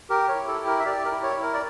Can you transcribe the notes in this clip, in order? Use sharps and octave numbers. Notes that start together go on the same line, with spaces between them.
G4 A#4
C#5
E4
A4
G4
A#4
E5
G4 D5
A#4
E4
C#5
E4
A#4
D5